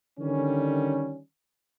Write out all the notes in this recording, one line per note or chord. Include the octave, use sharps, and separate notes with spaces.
D3 D#3 G3 C#4